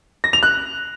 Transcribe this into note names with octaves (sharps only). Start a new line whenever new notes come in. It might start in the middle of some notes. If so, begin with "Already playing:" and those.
A#6
F7
F#6